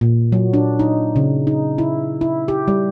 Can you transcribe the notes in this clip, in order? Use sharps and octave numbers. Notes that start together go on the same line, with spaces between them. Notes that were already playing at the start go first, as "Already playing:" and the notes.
A#2
F#3
D4
D#4
C#3
D#4
E4
E4
G4
G3